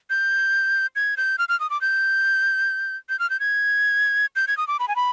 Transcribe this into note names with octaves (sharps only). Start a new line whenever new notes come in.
G6
G#6
G6
F6
F6
D#6
D6
G6
G6
F6
G6
G#6
G6
G#6
D#6
D6
B5
G#5
B5